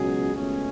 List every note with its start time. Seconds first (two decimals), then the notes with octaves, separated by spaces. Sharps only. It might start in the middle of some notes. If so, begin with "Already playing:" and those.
Already playing: C#2 B2 F#3 C#4 G#4
0.34 C#2 B2 A3 C#4